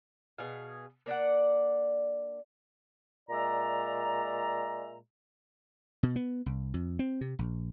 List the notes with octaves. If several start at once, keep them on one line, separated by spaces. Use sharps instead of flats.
B2 G#4 F5
A#3 D4 D5 F#5
A#2 G#3 D5 E5 A#5
B2
B3
C2
F2
C4
C3
A#1